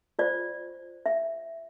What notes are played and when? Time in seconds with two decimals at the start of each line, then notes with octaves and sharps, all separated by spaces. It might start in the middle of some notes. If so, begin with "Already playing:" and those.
0.19 F4 C5 D5
1.06 E5